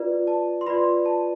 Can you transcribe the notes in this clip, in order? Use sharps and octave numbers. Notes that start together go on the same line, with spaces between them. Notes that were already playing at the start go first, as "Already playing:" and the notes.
Already playing: F4 B4 D5
A5
C6
F4 B4 D5 B5
A5